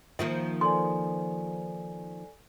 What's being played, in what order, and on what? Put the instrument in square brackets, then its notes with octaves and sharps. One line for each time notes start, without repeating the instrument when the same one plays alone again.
[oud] D#3 F3 A#3 [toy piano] E5
[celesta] A4 D5 G#5 [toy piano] C6